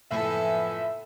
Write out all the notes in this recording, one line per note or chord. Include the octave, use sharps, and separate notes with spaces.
F#1 A2 F3 B3 A4 E5 G#5 C7